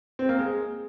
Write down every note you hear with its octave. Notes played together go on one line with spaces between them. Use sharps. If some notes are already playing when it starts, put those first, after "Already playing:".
C4
A#3
G#3